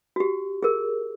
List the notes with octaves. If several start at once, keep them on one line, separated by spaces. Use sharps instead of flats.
F#4 G4
G#4 A#4